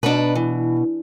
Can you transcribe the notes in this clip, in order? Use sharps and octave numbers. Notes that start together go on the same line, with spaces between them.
B2 D4 D#4 B4
E3